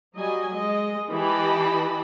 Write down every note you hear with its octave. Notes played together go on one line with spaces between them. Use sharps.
F#3 G3 D#5 G#5
G#3 D#5
E3 G4 D#5 A5 B5